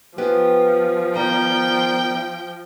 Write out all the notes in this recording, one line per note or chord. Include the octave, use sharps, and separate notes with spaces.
F3 B3 G4 G#4
D#3 B3 C4 D5 G5 A#5